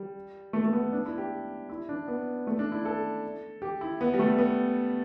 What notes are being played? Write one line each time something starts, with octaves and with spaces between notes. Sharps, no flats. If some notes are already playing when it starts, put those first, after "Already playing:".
Already playing: G3
A3
A3
B3
D4
E4
G4
E4
D4
B3
A3
D4
E4
A4
G4
E4
B3
G3
A3
B3